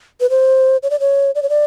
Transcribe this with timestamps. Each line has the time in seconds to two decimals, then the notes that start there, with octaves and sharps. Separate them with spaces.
0.20 B4
0.30 C5
0.83 C#5
0.90 D5
1.00 C#5
1.35 D5
1.43 C#5
1.49 D5